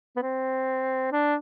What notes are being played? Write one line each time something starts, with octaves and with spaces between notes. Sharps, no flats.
B3
C4
D4